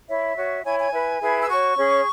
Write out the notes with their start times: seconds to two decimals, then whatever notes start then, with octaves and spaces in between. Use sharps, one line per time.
0.08 E4 C#5 E5
0.37 F#4 C#5
0.64 E4 C#5 G#5
0.79 G#5
0.92 E4 B4
1.21 E4 G#4 B4
1.43 E6
1.49 F#4 C#5 C#6
1.77 C#4 G#4 C#5